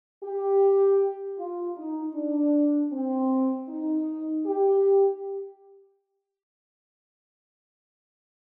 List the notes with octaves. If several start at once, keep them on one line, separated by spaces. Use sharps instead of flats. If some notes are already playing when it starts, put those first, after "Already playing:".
G4
F4
D#4
D4
C4
D#4
G4